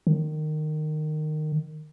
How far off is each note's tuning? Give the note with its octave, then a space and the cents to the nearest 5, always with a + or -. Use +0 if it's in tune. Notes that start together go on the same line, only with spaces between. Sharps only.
D#3 -20